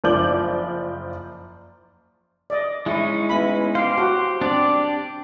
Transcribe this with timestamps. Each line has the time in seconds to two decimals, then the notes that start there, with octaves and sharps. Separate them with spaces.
0.04 F#1 F3 D5 D6 G6 F#7
2.50 D5 D#5
2.86 G#3 C#4 D#4 E4
3.29 B3 E4 B5
3.75 G4 C5 F5
3.98 F#4
4.41 C4 D4 G4 D5